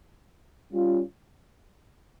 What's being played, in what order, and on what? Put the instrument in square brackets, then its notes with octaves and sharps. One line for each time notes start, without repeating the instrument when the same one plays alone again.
[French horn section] G3 C#4 F4